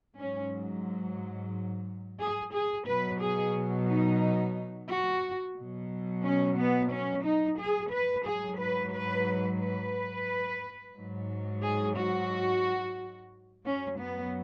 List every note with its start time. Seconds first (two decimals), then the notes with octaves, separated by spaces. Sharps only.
0.17 G#2 F#3 C#4
2.19 G#4
2.53 G#4
2.86 B2 F#3 B4
3.20 G#4
3.88 D#4
4.89 F#4
5.56 B2 F#3
6.24 C#4
6.58 B3
6.91 C#4
7.25 D#4
7.59 G#4
7.92 B4
8.26 G#2 F#3 G#4
8.60 B4
8.93 B4
9.61 B4
10.96 G#2 F#3
11.62 G#4
11.96 F#4
13.65 F#2 F#3 C#4
13.99 B3